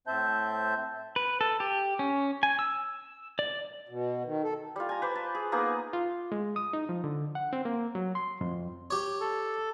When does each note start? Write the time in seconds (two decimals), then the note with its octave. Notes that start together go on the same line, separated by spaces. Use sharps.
0.07 A2 C4 C5 E5 A5 G6
1.16 B4
1.41 A4
1.60 G4
1.99 C#4
2.43 G#5
2.59 E6
3.39 D5
3.89 B2
4.25 D#3
4.43 A4
4.76 G3 F4
4.89 G#5 A#5
5.02 B4 C5 D5
5.15 A5
5.35 G#4
5.52 A#3 B3 D#4 G#4
5.93 F4
6.32 G#3
6.56 D#6
6.73 D#4
6.89 F3
7.04 D3
7.35 F#5
7.53 C4
7.65 A#3
7.95 F#3
8.15 C6
8.41 F2
8.91 G4 C#5
9.20 A4